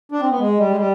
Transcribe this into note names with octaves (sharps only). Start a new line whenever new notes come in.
D4
C4
B3
G#3
G3
G#3
G3